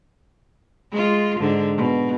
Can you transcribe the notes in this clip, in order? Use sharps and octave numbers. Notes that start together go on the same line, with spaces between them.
G#3 F4
G#2 D3
B2